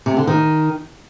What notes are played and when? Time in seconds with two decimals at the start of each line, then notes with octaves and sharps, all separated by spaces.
0.06 C3
0.17 D3
0.27 D#3